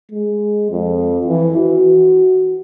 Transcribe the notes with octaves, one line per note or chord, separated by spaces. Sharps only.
G#3
F2
E3
F#4